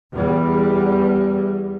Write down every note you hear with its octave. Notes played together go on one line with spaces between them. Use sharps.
E2 G3